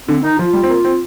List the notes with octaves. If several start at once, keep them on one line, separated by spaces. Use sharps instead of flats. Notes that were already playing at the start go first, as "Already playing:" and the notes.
D3 C4
D#3 D#4
F3 F4
G3
C4
A#3
C4